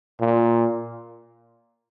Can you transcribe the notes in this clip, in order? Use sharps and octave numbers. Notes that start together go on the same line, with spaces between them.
A#2